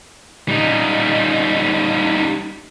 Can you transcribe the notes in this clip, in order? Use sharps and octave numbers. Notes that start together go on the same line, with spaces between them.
G3 D#4